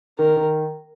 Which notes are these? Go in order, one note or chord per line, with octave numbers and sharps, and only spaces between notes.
D#3 A#4
D#3